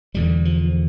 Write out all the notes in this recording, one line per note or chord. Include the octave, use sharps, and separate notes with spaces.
E1 E2 D3 G3
F3